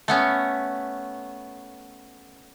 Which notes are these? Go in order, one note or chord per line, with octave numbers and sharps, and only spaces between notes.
A3 B3 C#4